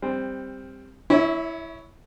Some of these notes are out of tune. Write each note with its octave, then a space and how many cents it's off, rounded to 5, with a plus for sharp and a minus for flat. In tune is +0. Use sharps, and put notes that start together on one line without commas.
G3 +20 C4 +0
E4 +0 C#5 +15 E5 -35